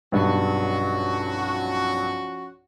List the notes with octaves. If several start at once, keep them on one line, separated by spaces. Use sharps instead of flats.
B1 G2 F3 C#4 F#4